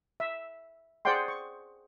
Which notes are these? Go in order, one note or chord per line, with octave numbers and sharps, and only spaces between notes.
E5
G#4 C5 D5 F#5 G5 C6
C#6